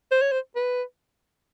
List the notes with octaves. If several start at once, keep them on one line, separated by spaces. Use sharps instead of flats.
C5
C#5
C5
B4